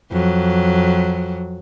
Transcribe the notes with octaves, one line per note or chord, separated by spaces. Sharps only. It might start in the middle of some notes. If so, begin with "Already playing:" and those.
F2 F#3